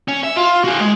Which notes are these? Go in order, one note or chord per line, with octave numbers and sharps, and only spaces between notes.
C#4
E5
F4
F#4 G#4
G#3